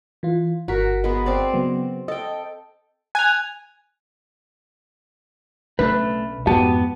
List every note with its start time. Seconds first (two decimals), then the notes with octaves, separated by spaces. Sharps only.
0.23 E3 F4
0.68 G1 F#4 A#4 A#5 B6
1.04 G#3 B3
1.26 C4 C5 D5
1.54 C#3 F#3 B3
2.08 A4 D#5 G5
3.15 G#5 F#6 G#6 F7
5.79 B1 C#3 A3 D4 B4
6.47 F2 G#2 B3 F#4 G4 A5